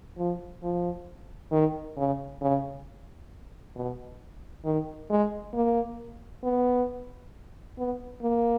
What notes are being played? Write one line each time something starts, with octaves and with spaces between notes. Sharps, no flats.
F3
F3
D#3
C#3
C#3
B2
D#3
G#3
A#3
B3
B3
A#3